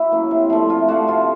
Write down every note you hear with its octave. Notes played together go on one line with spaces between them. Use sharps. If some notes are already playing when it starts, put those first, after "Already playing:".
Already playing: E4 F#4
F#3 A#3 C#4
C3
F3 A3 D4
C3 F4
F3 A3 D4 F#4
C3 F4